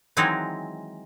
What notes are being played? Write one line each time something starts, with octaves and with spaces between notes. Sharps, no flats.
D#3 E3 F#3 G#3 C4 D#4